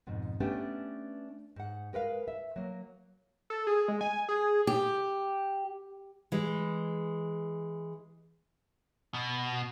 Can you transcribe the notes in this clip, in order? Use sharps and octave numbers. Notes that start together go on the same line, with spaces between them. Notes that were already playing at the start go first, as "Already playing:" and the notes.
F2 G#2 B2
A3 B3 C#4 D4 G4
G#2 F#5
G#3 A#4 B4 F5
E5
F#3 A#3
A4
G#4
G#3
G#5
G#4
G4
E3 G#3
B2